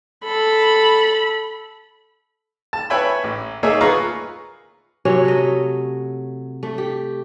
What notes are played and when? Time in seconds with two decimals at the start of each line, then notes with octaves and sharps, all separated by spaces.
0.25 A4 B5
2.73 A5
2.90 B4 C#5 E5 G5 G#5 B5
3.24 A1
3.63 A3 A#3 D#4 G#4 C#5 E5
3.81 F4 G#4 B4 F5 A#5 C#6
5.05 C3 F#3 C#4 C#5
5.25 A3 D#5
6.63 A3
6.78 G4